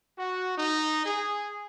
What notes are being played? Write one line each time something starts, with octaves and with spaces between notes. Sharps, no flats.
F#4
D#4
G#4